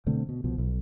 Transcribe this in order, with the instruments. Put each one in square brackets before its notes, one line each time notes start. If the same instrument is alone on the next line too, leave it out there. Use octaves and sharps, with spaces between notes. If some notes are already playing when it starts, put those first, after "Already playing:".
[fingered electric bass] B2 D3 A3 C4
B2
C2 B2 F3
B1